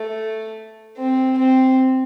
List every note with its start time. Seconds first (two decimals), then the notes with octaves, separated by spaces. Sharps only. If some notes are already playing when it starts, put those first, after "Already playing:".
Already playing: A3
0.97 C4
1.38 C4